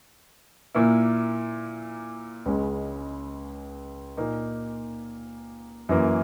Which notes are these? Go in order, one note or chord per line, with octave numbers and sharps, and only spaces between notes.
A#2 A#3 E4
C#2 C#3 G#3
A#2 A#3 D#4
F#2 E3 A#3